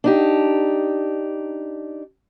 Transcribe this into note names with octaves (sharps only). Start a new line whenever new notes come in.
D4 D#4 G4